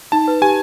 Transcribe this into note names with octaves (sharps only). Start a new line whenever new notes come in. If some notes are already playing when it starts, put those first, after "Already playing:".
D#4 A5
B4
G4 G#5